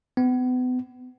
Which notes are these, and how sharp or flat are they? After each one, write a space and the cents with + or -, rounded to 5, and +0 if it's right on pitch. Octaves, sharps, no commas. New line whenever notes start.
B3 +35